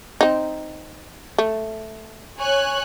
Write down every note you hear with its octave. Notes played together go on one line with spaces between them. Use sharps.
C4 D#4
A3
C#5 G#5 F#6